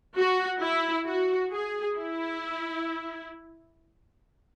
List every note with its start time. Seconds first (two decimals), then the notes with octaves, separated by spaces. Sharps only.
0.16 F#4
0.61 E4
1.05 F#4
1.51 G#4
1.96 E4